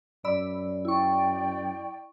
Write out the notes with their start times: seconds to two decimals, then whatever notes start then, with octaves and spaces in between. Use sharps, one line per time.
0.24 F#2 D5 B5 E6
0.85 E4 D5 G5 C#6